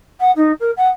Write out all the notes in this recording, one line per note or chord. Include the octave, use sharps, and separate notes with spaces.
F#5
D#4
A#4
F#5